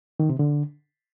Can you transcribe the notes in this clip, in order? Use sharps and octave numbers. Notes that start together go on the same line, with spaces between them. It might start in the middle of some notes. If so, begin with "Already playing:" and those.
D#3
C3
D3